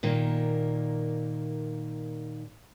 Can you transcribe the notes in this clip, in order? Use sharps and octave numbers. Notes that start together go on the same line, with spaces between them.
A#2 D#3 A#3